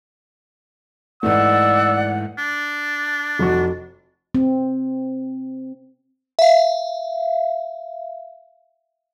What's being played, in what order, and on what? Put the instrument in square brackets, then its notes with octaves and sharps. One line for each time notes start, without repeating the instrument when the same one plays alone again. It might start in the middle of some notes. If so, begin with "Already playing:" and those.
[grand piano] G#2 E3 A3 [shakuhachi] D5 [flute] F#5 [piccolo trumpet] E6
[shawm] D4
[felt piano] F1 F#4
[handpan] C4
[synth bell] E5 F5